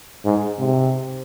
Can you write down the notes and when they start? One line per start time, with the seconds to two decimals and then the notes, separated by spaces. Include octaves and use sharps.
0.25 G#2
0.59 C3